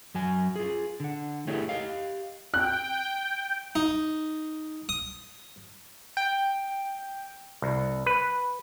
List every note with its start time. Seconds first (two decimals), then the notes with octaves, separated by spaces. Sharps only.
0.14 F#2 F#3 G#5
0.56 F4 G#4
1.00 D3 F#5
1.47 A3 D4 E4 G4 G#4 C#5
1.69 G4 D#5 F5
2.54 G5 F#6
3.75 D#4
4.89 D#6
6.17 G5
7.62 C2
8.06 B4